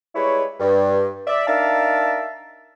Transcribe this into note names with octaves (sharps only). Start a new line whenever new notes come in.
G3 G#3 E4 B4 C#5
G2
D5 E5
D4 D#4 A#4 E5 F5 A5